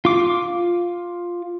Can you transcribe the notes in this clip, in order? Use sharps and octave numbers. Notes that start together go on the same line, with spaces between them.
F4 D6